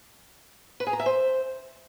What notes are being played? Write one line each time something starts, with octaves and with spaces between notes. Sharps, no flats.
B4
G#4
A#5
E5
C5